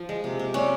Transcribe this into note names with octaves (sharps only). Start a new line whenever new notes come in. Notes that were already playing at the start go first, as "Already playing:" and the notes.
Already playing: F3
G#3
C3
C3
G3 C#4